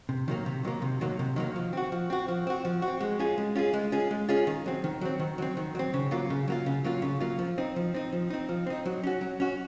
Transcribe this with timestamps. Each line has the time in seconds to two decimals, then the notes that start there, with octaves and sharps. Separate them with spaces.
0.09 C3
0.28 D#3 F#3 A#3
0.46 C3
0.64 D#3 F#3 A#3
0.82 C3
1.01 D#3 F#3 A#3
1.19 C3
1.36 D#3 F#3 A#3
1.56 F3
1.73 C4 F#4
1.92 F3
2.10 C4 F#4
2.28 F3
2.47 C4 F#4
2.65 F3
2.82 F#4
2.88 C4
3.00 G#3
3.19 C#4 F4 G#4
3.38 G#3
3.55 C#4 F4 G#4
3.74 G#3
3.92 C#4 F4 G#4
4.11 G#3
4.29 C#4 F4 G#4
4.47 D#3
4.66 F#3 C4
4.84 D#3
5.01 F#3 C4
5.20 D#3
5.38 F#3 C4
5.57 D#3
5.75 F#3 C4
5.94 C#3
6.11 F#3 A#3 F4
6.30 C#3
6.48 F#3 A#3 F4
6.66 C#3
6.84 F#3 A#3 F4
7.02 C#3
7.20 F#3 A#3 F4
7.39 F3
7.58 C4 D#4
7.76 F3
7.94 C4 D#4
8.13 F3
8.30 C4 D#4
8.49 F3
8.67 C4 D#4
8.86 F#3
9.03 C#4 F#4
9.21 F#3
9.40 C#4 F#4